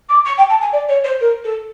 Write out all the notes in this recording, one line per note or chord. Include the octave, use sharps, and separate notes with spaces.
D6
C#6
G5
A5
G#5
D5
C#5
C5
A#4
A4